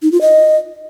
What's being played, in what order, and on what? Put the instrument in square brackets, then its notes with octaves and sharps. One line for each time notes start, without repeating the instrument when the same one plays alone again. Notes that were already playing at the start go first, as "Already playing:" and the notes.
[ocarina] D#4
F4
D#5